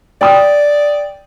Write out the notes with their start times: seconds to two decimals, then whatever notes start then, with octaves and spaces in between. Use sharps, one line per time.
0.21 D5 G5 D#6